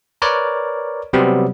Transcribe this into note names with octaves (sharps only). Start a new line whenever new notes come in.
A#4 B4 C#5 D5
C3 F#3 G3 B3 C4 G4